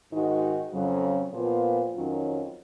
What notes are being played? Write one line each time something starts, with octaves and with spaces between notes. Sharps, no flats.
G#2 D#3 G#3 D#4 F#4
F2 C#3 F#3
A#2 F3 B3 F4
F2 D#3 F#3 C#4 F4